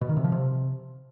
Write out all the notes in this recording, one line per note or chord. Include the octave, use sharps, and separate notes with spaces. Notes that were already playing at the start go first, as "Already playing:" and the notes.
B2
D#3
C3
F3
C3